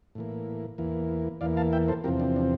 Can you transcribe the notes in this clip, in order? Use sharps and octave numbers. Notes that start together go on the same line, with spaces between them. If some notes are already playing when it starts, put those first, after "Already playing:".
A2 E3 A#3
E2 E3 A#3
E2 E3 A#3 D5 F5
F5 A5
E5 G5
A4 C5
E2 C3 F3 C4 G4 A#4
D4
D4